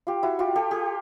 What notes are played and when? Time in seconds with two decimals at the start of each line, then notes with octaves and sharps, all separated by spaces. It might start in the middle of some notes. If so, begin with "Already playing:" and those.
0.07 F4 G4
0.23 E4 F#4
0.39 F4 G4
0.56 G4 A4
0.71 G4 A4